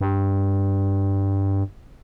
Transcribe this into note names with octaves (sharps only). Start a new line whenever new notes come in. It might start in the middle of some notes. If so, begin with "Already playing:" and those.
G2